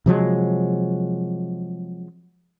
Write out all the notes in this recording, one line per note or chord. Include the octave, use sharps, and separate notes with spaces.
C3 F3 F#3 G#3